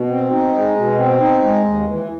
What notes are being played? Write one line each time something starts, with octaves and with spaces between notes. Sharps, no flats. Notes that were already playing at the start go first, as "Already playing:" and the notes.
Already playing: B2
C4
D#4
G#3
B2
C4
D#4
G#3
D#2
E3